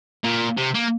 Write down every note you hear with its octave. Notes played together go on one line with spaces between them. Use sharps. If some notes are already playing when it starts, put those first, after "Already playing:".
A#2
C3
A#3